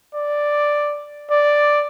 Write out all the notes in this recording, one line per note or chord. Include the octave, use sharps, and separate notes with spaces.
D5
D5